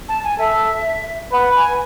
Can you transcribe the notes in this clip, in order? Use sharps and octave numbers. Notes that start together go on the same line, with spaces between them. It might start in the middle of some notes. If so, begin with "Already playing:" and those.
A5
G#5
A4 E5
B4 F#5
G#5